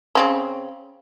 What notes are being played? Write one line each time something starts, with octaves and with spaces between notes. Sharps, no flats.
C#3 C4 C#4